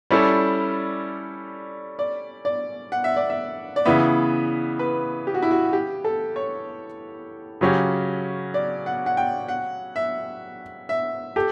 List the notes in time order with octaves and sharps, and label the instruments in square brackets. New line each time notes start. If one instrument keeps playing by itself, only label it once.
[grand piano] G3 C#4 E4 A4 [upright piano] D5
[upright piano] D5
D5
F#5
E5
D5
E5
D5
[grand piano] C#3 E3 B3 [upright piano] E5
[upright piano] B4
G4
F#4
E4
F#4
G4
A4
C#5
[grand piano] C#3 F#3 C#4 G4
[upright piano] D5
F#5
F#5
G5
F#5
E5
E5
[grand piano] G4 [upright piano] A4